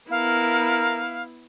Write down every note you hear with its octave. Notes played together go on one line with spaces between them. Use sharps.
B3 E4 A#4 F5